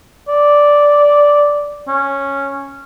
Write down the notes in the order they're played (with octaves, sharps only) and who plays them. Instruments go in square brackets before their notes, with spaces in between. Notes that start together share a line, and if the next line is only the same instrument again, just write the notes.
[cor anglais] D5
C#4